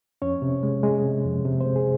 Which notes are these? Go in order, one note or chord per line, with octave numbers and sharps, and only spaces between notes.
F2 C#4 C#5
C3
G#3
G#3
C3
F2
C3
G#3 C4 C5
G#4